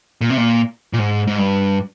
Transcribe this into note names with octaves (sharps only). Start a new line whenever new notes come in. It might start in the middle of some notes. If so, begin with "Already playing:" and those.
A#2
C3
A#2
A#2
G#2
G#2
G2